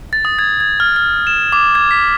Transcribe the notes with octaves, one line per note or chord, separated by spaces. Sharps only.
A6
D#6
G#6
G#6
F6
F6
E7
D6
G#6
B6